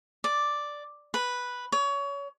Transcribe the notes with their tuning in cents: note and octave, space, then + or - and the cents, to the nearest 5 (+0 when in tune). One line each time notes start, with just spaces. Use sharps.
D5 +0
B4 -5
C#5 +25